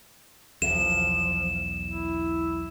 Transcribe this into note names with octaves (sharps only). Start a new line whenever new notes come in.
B1 E2 F3 E7
E4